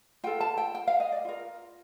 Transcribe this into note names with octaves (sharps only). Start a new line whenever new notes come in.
F4 A4 G5
A5
G5
G5
F5
D#5
D5
F4 A#4